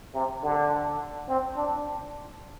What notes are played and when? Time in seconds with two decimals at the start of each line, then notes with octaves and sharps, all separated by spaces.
0.14 C3
0.43 D3
1.28 C4
1.56 D4